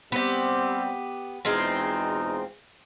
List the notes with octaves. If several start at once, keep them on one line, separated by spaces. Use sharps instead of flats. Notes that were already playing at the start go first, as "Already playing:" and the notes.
G3 B3 C4 G4
E2 B2 G#3 C4 D#4 F4